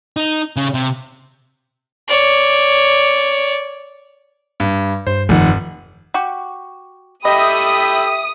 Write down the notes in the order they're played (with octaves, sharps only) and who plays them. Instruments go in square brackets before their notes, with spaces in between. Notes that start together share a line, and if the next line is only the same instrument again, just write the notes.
[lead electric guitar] D#4
C#3
C3
[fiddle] C#5 D5
[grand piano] G2
[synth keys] G2 [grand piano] C5
[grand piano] F1 F#5 [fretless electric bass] D#3 F3 A3
[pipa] F#4 G4
[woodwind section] G4 E5 [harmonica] A4 G5 B5 [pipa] D#5 [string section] D#6